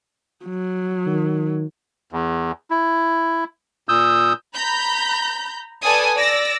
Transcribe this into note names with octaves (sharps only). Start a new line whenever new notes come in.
F#3
D#3
E2
E4
A#2 D#6 E6 G6
A#5 B5 G6
A4 B4 D5 G#5 D#6
D5 E6 A#6